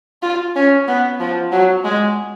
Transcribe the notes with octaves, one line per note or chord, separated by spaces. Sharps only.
F4
C#4
B3
F3
F#3
G#3